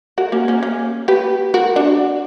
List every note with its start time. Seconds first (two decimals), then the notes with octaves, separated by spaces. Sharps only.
0.18 F#4 A#4
0.32 A#3 C#4
0.48 A#3 C#4
0.63 A#3 C#4
1.08 G4 B4
1.54 F#4 A#4
1.76 D4 F#4